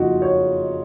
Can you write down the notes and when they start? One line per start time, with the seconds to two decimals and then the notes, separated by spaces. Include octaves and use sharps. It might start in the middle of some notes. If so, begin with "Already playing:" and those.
Already playing: F#1 F2 F3 G#3 D#4 F4 F#4
0.22 C#5